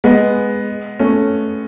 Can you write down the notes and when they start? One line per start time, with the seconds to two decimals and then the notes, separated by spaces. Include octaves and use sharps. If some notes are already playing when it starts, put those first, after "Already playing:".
0.04 G#3 B3
0.99 A3 C#4